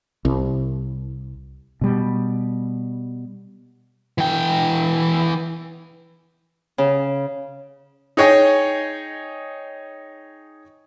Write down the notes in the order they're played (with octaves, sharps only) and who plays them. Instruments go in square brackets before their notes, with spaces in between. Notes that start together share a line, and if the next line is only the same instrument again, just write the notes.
[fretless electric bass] C2
B2 G3
[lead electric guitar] E3 G5
[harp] C#3
[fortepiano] D#4 G#4 C#5 D#5 G5 G#5